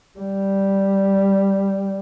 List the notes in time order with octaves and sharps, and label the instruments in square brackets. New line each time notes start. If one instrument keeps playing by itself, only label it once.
[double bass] G3